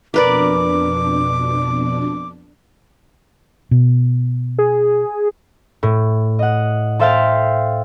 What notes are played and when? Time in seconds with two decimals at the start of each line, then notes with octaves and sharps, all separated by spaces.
0.14 F2 B2 D4 A#4 B4 D5 D6
3.71 B2
4.59 G#4
5.83 A2
6.39 D#5 F#5
6.99 A4 C5 E5 F5 G5 A5